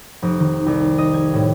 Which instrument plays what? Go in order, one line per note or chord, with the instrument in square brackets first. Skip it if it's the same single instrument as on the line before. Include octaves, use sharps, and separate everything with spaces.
[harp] F1
D#3
C2
D#5
G#6
A2